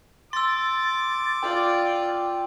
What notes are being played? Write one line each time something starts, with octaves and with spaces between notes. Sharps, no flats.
C6 D6 E6 A6
F4 D5 G5